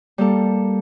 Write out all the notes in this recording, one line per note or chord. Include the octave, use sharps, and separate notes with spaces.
G3 A#3 A4